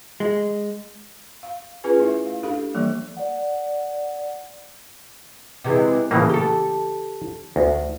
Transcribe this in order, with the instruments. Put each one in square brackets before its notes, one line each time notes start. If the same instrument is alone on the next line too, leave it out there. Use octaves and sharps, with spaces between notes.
[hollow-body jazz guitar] G#3
[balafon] F5
C#4 F4 G#4 B4 G#5
A3 E4 E5
F5
D4 G4 A4 F5
E3 F3 G3 A#3
[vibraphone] D5 F#5
[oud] C3 E3 G#3
[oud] E2 A2 [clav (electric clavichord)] C#3 E3 A#3
[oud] G4 A4
[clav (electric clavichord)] D2